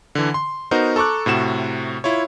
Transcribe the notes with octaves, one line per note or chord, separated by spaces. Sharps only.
D3 E3
C6
B3 D#4 F#4 A#4 C5
A4 A#5 C#6 D6 F#6
A2 C3 F#4 E7
E4 F4 C#5